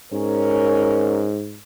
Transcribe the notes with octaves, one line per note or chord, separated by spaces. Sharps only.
G#2 C#4 A#4